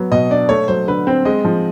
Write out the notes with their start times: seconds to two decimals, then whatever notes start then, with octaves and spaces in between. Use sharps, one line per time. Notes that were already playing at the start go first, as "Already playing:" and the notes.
Already playing: F#3 B3
0.11 B2 D#5
0.30 D4 D5
0.49 A3 C#5
0.68 F#3 C5
0.88 D3 B4
1.07 C4 C5
1.25 G#3 D#5
1.45 F3